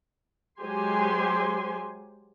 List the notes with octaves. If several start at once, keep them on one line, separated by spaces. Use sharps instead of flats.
F#3 G#3 G4 C5 G#5 C6